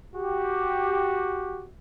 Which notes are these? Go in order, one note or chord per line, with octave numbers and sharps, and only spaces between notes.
F#4 G4